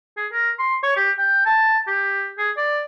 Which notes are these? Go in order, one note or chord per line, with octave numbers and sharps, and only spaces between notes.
G#4
A#4
C6
C#5
G4
G5
A5
G4
G#4
D5